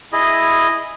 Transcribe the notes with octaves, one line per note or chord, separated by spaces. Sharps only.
E4 G#4 D#5